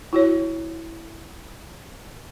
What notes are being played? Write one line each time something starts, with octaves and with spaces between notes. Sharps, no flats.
E4 F#4 C#5